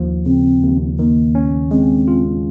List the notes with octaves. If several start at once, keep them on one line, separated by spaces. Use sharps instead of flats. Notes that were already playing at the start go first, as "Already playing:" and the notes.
Already playing: D#2 F3
C#3 C4
D#2
D#3 A#3
C#4
G#3 C4
F4